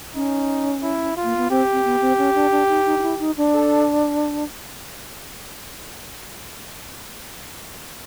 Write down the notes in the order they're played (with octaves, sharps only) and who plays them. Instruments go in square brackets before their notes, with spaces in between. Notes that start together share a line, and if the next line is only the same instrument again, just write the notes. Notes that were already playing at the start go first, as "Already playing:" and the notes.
[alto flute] C#4 [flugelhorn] D#4
[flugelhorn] E4
F4
[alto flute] A#3
B3
[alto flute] C4 [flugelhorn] G4
[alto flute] C4
B3
C4
C#4
D4
D4
D#4
D#4
D#4
E4
D#4
D4
[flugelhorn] A4